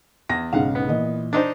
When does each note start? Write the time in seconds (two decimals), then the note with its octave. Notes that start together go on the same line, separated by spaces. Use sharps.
0.29 E2 A#6
0.53 B1 G#2 C#3 F5 F#5
0.75 B3
0.88 A#2 E3 D#5
1.33 D4 D#4 C5